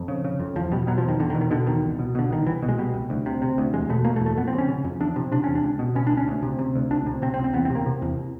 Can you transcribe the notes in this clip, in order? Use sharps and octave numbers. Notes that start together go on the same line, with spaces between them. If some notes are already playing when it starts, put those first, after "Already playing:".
Already playing: F2
C#3
C#3
F2
E2 F3
B2 G3
B2 F#3
F3
E2
D#3
E2 D3
D#3
B2
D#3
B2 D3
E2 D#3
C2
B2
B2 D3
C2 D#3
C2 E3
B2
G#3
B2 G3
C2
D2
C3
C3
D2
E2 G#3
B2 A3
B2 A#3
A3
E2
A3
F2 B3
C4
C#3
C#4
C#3
F2
E2 D4
C3
C3 D4
E2 C#4
D4
C#2
B2
B2 C#4
D4
C#2
C#4
D2
C3
C3
D2
C#2 D4
C3
C3 C4
C4
C#2
C4
E2 B3
C4
C3
A#3
C3
E2